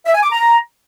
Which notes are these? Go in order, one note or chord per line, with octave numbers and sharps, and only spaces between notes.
E5
G#5
D6
A#5